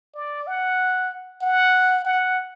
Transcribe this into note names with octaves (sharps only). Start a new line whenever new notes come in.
D5
F#5
F#5
F#5